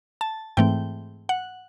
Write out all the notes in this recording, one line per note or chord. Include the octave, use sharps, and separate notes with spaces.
A5
G#2 E3 A3 C4 G5
F#5